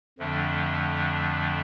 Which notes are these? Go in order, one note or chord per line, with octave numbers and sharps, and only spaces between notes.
F2 D3 F3 A3 D4